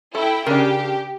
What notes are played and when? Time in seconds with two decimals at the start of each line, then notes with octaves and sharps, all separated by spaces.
0.15 E4 A4 G5
0.46 C#3 D4 G4 A#4